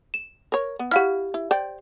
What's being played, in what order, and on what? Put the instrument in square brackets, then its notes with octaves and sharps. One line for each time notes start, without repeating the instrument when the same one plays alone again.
[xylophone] E7
[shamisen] A#4 C#5
B3
[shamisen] E4 F#5 [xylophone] G4 F5 F6
[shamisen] E4
C5 D5 G5